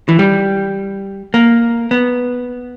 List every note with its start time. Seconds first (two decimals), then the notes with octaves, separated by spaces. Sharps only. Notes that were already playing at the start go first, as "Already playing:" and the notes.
0.09 E3
0.19 G3
1.34 A#3
1.91 B3